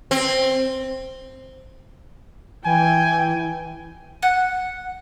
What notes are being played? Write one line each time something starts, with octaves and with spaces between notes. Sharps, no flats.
C4
E3 G5 G#5
F#5